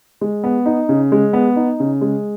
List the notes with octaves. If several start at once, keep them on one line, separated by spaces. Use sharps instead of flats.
G#3
B3
D#4
C#3
G#3
B3
D#4
C#3
G#3